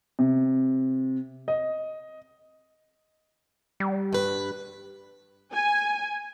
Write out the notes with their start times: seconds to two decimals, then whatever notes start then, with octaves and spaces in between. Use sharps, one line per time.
0.19 C3
1.48 D#5
3.80 G3
4.13 G2 B4
5.53 G#5